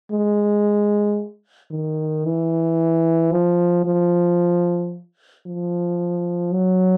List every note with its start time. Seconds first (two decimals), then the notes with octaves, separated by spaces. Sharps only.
0.11 G#3
1.71 D#3
2.25 E3
3.32 F3
3.85 F3
5.47 F3
6.53 F#3